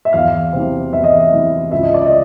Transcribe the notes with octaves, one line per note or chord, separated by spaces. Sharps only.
E5
E2 F5
C3 E3
E2 E5
D#5
E5
C3 E3
C#2 E5
D#5
D5
D#5